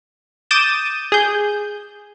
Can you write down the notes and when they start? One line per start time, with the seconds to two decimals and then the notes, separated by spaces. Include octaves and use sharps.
0.51 D6 D#6 G6 A6 D#7 E7
1.12 G#4 G6